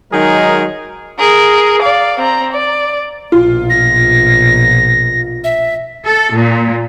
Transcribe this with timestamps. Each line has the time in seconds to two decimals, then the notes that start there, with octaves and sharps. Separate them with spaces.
0.13 D#3 F#3 G#3 D#4 G#4 A#4
1.19 G#4 A#4
1.82 D5 F5
2.19 C4 A#5
2.53 D5
3.32 A#1 B2 F4
3.70 A#6
5.44 E5
6.06 A4
6.36 A#2